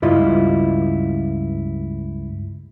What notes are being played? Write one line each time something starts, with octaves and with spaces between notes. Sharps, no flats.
C#2 G2 E4 F4 D#5